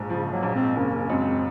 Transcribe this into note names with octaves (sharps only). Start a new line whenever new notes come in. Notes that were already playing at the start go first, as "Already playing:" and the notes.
Already playing: A#1 G#2
C#3 F3
F#3 A#3
A#1
G#3 C4
F#1 A#3 C#4
F#2 G#3 C4